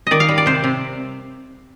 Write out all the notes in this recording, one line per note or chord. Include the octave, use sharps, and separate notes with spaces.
D#3 D5 D#5
F5
G3
D5
C3 C5
C3